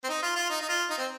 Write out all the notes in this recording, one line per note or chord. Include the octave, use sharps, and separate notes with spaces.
C4
D#4
F4
F4
D#4
D#4
F4
D#4
C4